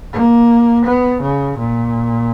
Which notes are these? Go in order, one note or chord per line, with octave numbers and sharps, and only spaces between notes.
A#3
B3
C#3
A#2